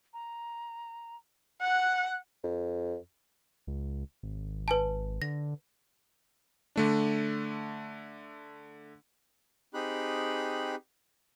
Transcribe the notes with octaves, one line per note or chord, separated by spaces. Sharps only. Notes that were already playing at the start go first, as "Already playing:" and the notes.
A#5
F#5 F#6
F2
C#2
G#1
B4 G#5 A5
D3 A#6
D3 A3 D4
C4 D#4 G4 G#4 B5 F#6